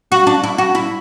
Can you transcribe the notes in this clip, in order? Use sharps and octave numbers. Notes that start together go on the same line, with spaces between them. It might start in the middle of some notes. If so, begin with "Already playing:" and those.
F#4
D4
E4
F#4
E4